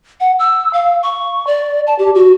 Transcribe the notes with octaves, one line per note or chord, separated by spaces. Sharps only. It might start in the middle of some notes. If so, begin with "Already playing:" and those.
F#5
E6
F5
C#6
D5
A5
G4
F#4